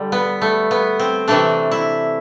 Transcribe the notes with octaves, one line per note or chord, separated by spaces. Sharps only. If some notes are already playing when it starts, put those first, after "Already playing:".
Already playing: D3 G3
B3
A3
B3
C4
C3 E3 A3 D4
E4